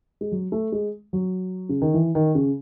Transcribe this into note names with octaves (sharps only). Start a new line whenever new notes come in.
G#3
F#3
A3
G#3
F#3
C#3
D#3
E3
D#3
C#3